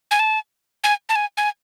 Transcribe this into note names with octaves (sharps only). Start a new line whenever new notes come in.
G#5
A5
G#5
A5
G#5
G#5